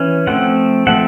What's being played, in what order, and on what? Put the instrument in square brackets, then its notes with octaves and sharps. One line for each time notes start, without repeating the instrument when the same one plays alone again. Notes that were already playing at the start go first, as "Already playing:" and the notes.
Already playing: [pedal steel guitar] E3 C#4
F3 A3 C4 F#5
F3 A3 C4 F#5